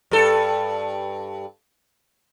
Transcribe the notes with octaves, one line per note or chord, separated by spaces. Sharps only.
G2 A4